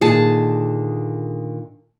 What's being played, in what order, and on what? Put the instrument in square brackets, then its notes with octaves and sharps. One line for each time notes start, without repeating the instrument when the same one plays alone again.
[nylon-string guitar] A#2 D3 D#3 [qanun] G#4 A5